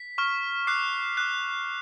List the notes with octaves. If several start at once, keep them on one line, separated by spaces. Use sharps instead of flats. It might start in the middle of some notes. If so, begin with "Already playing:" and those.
Already playing: B6
C#6 F6
D6 F#6 C7
D6 F#6